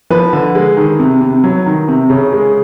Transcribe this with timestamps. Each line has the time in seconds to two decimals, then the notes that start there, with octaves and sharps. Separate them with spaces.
0.10 F3 B4
0.33 D3
0.55 G#3
0.77 D#3
0.99 C3
1.21 C3
1.44 F#3
1.66 D#3
1.88 C3
2.10 C#3
2.33 G#3